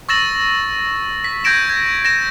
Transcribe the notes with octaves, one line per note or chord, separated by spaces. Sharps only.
C#6 E6 A6 A#6 E7 F#7
B6
C#6 G6 G#6 A#6 D7 E7
G#6
A#6 D7 E7